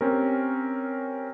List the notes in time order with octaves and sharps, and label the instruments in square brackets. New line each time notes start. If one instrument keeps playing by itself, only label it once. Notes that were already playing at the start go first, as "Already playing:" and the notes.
[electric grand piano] C4 C#4 G4 A#4